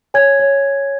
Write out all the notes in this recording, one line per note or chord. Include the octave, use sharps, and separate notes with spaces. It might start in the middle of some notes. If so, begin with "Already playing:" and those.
C#5 G#5 G#6
C#5